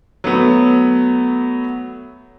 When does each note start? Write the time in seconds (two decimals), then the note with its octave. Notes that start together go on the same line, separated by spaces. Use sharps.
0.24 F#3 A3 B3